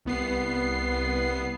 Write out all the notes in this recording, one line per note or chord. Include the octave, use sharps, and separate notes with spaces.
C2 B3 C7